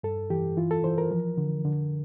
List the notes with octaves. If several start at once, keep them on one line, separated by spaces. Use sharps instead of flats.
G2 A4
E3 G4
E3 F4
A4
E3 C5
A#4
F3
D3
D3